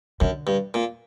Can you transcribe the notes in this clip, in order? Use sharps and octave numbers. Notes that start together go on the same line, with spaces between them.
F#2 D3
G2
A#2